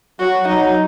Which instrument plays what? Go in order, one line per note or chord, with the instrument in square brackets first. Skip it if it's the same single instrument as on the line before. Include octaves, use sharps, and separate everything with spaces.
[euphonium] F#3 [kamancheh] F#4
[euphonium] F#3 [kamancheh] D#4